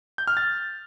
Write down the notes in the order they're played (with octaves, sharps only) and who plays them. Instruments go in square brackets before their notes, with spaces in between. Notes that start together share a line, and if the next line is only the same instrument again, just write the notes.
[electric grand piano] G6
F6
A6